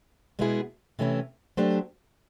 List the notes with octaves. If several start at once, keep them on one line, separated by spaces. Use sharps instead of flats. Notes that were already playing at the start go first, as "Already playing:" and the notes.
B2 G#3 B3 E4 G#4
C3 E3 A3 C#4 E4
F#3 A3 D4 G4 C5